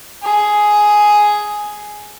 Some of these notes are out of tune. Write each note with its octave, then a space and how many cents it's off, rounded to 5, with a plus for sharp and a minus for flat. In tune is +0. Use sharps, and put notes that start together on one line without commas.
G#4 +5